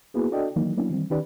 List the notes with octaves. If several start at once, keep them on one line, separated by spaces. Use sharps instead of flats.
A#3 B3 E4 F#4 G#4 B4
D4 F#4 A4 D5 D#5 G5
D#3 E3 F#3 A#3 D#4
F#3 A#3 B3 C#4 D4 E4
D#3 E3 G3 C4
D#3 C#4 D#4 G4 B4 D5